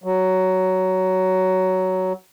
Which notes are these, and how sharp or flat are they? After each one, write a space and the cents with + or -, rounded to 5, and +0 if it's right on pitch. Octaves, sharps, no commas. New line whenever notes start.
F#3 +10